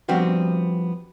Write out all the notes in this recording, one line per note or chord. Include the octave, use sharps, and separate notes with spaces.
F3 G3 B3 C4 D4 F#4